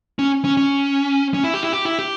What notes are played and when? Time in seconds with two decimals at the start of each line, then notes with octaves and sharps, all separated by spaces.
0.19 C#4
0.45 C#4
0.57 C#4
1.34 C#4
1.44 E4
1.54 G4
1.63 E4
1.73 G4
1.85 E4
1.99 G4